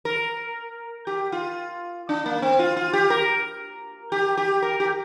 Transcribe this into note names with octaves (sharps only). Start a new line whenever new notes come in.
A#4
G4
F4
D4
A#3
C4
F4
F4
G4
A#4
G4
G4
A#4
G4